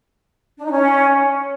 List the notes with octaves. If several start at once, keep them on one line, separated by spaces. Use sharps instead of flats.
D4
D#4
C#4